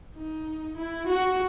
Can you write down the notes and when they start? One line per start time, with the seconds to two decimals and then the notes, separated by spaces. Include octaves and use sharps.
0.15 D#4
0.77 E4
1.07 F#4